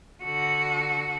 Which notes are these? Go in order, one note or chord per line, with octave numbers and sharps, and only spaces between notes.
D3 F#4